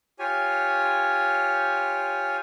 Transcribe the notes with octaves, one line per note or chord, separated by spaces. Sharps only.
F4 G4 C#5 G#5